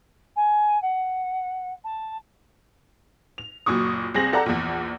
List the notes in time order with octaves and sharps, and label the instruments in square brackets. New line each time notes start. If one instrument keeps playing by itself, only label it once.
[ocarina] G#5
F#5
A5
[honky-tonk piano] F7
F#1 A#2 F#3 C#6 D#6
C2 C4 G#4 A#6 F#7
G4 A4 D5 F#5 A#5
A#1 E2